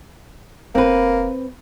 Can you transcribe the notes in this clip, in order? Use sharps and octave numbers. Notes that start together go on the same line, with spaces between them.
F1 A#3 C4 B4